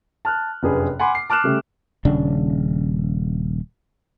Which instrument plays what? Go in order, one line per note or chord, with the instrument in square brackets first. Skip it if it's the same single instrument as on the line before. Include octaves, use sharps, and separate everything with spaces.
[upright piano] A5 F6 F#6
F1 F#2 D4 G#4 B4
F#5 G#5 B5 C6 D6
C7
A5 D6 F6 F#6 E7
C#3 G3 A3
[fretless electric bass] D#1 C#3 D4